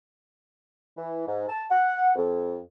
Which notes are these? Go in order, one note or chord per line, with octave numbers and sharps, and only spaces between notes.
E3
G#2
A5
F#5
F2